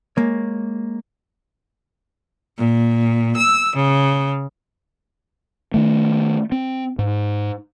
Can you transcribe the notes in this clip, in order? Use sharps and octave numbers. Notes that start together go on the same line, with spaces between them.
G#3 A#3 C#5
A#2
E6
C#3
D#3 A3
C4
G#2